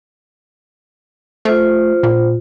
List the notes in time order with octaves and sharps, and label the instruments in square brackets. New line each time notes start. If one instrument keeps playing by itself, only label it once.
[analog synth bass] A3 [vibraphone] F4 C5
[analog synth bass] A#2